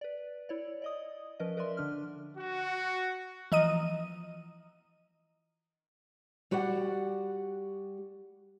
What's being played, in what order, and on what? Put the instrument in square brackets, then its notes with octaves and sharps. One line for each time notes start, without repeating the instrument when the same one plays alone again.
[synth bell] B4 D5
E4 C#5 D5
D5 D#5 D#6
F3 C#4 A#4 B4 D#5
A#4 B4 D5 E5 C6
D3 D4 F6
[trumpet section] F#4
[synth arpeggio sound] E3 F3 D#5 A#5 D#6 D#7
[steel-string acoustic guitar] G3 F#4 G4 D5 F#5